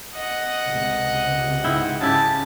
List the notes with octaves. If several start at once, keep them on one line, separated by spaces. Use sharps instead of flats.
D#5 F#5
C#2 C3
G#2 E4 G5
C#3 E4 G4 A5